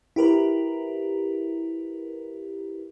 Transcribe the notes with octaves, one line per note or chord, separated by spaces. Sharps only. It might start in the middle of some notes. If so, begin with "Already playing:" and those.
E4 G4 A#4 B4